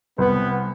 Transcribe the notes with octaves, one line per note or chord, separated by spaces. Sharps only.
C2 B3